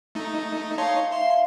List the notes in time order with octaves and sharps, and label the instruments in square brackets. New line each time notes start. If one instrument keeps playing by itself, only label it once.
[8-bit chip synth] A3 D#4
[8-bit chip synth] D#4 C#5 C6 [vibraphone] F5 A5
[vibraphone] E5 F5 [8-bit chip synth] C6